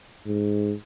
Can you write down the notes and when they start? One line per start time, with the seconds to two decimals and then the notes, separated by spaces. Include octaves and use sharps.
0.26 G#2